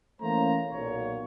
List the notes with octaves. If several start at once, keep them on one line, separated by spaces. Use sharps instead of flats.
E3 A3 A#3 C#4 C5 A#5
B1 A#2 C#5